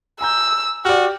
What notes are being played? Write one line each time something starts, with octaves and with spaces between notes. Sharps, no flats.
G#5 A#5 E6 G6
F#4 G4 D5 F6